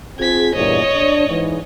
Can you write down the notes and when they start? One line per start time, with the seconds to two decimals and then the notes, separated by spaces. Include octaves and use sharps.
0.19 C4 F4 G#4 G#6 B6
0.55 E2 G2 A#2 C#5 D#5
0.95 D4
1.28 G#2 E3